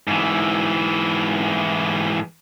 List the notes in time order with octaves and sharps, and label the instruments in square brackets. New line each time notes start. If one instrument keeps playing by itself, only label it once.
[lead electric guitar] G#2 E3